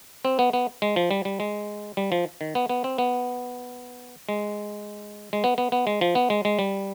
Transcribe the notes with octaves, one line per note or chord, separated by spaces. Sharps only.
C4
B3
B3
G#3
F3
G3
G3
G#3
G3
F3
D#3
B3
B3
C4
B3
G#3
G#3
B3
B3
B3
G#3
F3
B3
G#3
G#3
G3